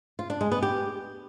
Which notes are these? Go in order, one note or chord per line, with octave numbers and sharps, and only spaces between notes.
F4
D4
G#3
B3
G4